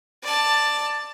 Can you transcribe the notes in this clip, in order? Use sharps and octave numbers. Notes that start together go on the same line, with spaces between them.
D5 A5